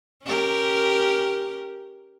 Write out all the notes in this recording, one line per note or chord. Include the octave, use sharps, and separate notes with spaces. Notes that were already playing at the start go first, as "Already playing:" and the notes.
C#4 G4 A#4